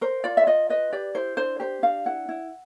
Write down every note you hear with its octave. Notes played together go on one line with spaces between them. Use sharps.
A#4 C5
F4 D5
E5
F4 D#5
B4 D#5
G4 D5
E4 C5
D4 C5
G4 C5
D4 F5
E4 F#5
E4